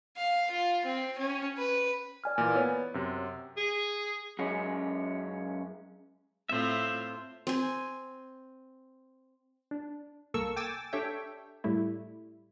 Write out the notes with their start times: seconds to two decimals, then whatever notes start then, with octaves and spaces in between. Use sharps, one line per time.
0.17 F5
0.51 F4
0.85 C4
1.18 C#4
1.58 B4
2.24 D5 G#5 F6
2.38 A#2 E3
2.56 B3 C#5
2.94 F#2 C3
3.57 G#4
4.39 F#2 G#3 C#4
6.49 A2 C4 F4 C5 E5
7.47 C4 G#5
9.71 D4
10.34 C2 A#3 A4 A#4 C#6 E6
10.56 G5 G#5 D6 E6 A6
10.93 D4 G4 A4 C#5 E5 G5
11.64 A2 G3 A3 E4